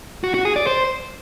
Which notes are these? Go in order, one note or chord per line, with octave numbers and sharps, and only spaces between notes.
F#4
F#4
G#4
D5
C5